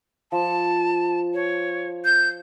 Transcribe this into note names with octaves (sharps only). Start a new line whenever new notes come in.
F3 A5
C#5
G6